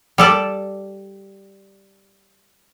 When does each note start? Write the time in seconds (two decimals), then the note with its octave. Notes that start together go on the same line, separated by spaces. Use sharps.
0.18 G3 A4 D5